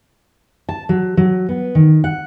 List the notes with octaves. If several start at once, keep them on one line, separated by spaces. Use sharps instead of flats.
A5
F#3
F#3
B3
D#3
F#5